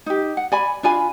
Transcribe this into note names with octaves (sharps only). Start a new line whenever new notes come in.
D#4 G4
F#5
D5 G#5 B5
D4 F4 G#5 B5